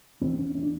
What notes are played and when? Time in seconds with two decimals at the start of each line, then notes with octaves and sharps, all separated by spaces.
0.21 E2 C4
0.39 C#4
0.55 C#4
0.63 D4